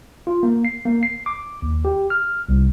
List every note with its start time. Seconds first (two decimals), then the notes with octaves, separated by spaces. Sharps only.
0.27 F4
0.43 A#3
0.65 C7
0.85 A#3
1.03 C7
1.26 D6
1.62 D#2
1.85 G4
2.10 F6
2.49 C2